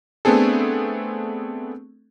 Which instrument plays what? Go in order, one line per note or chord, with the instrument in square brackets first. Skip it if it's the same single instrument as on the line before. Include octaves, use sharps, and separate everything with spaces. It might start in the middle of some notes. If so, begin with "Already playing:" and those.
[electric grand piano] A3 B3 C4 D4 G#4 A4